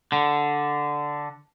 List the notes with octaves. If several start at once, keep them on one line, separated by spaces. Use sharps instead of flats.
D3